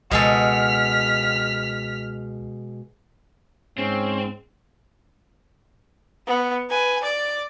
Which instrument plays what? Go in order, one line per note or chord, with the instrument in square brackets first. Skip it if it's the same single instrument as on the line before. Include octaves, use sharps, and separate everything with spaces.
[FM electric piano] C#2 [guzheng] B2 G#3 A4 [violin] F6 B6
[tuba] G#2 [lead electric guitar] C4 [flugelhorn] C#4
[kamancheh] B3
B4 G#5
D5 D6